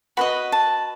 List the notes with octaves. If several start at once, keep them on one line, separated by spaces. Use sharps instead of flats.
F#4 B4 D#5 B5
A5